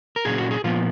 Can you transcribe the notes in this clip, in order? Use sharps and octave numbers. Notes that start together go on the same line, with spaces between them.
A#4
A#2 F#3 C#4 G#4
F#4
G#4
A#2 F3 B3 F4